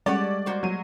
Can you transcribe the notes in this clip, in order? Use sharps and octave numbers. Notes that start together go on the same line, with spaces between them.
G3 G#3 C#4 A4 D5 F#5
A#3 F#4 C5
F#3 D#7